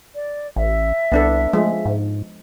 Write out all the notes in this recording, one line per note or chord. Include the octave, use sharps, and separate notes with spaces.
D5
A1 E5
C2 B3 D4 A4
F3 G#3 A3
G#2